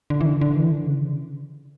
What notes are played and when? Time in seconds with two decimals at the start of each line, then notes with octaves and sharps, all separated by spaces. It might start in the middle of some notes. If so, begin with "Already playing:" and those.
0.10 D3
0.21 E3
0.26 D3
0.41 D3
0.56 E3
0.72 D3
0.86 C#3